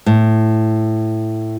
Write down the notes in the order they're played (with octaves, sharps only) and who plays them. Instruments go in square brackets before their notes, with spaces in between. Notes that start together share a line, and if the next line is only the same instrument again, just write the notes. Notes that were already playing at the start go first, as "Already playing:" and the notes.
[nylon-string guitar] A2